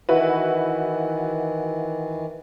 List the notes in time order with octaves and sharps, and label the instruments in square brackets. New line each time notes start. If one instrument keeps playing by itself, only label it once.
[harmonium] D#3 E3 [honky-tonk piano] E4 F#4 B4